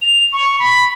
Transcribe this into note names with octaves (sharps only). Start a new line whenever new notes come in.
F7
C#6
B5